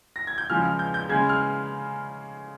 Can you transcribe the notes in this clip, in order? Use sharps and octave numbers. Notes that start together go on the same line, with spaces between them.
A#6
G#6
G6
C#3 F3 G#3 F6
F6
G6
G6
C#3 G#3 G#6
F6